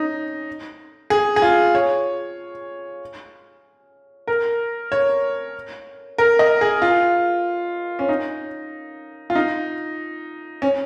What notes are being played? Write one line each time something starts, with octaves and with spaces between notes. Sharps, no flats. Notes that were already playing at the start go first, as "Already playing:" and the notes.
Already playing: C#4 D#4
G#4
G#4
F4
C#5
A#4
C#5
A#4
D#5
G#4
F4
C#4
D#4
F4
D#4
C#4